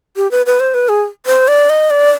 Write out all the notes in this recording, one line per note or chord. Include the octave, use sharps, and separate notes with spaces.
G4
B4
B4
C5
B4
G#4
C5
D5
D#5
D5